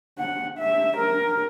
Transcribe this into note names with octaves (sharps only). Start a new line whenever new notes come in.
F#5
E5
A#4